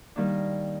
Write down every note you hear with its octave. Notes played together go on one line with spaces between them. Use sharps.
D#3 G3 A#3 D4